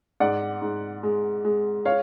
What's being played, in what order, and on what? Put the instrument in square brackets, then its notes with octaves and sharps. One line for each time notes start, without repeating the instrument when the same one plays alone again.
[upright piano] G#2 D5 F#5
G#2
G#3
G#3
C#5 F5